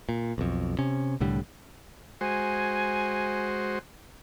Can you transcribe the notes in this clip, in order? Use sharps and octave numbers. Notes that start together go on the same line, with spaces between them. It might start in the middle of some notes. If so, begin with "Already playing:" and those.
A#2
B1 F2
C3 C#4
C2 A2 D3 G3
G#3 F#4 C5 G#5